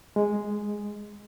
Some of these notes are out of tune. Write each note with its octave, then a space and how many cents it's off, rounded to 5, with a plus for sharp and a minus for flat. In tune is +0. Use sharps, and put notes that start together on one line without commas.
G#3 +0